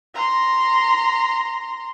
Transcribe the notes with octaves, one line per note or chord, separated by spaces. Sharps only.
A#5 C6